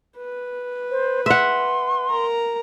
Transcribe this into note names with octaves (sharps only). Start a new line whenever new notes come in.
B4
C5
E5 F#5 C6
A#4 A#5